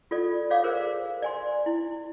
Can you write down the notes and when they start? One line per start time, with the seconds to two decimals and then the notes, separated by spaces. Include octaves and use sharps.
0.11 F4 A4 D5
0.50 C#5 D5 F5 D6
0.64 G#4 A#4 C5
1.22 D5 G#5 C6
1.66 E4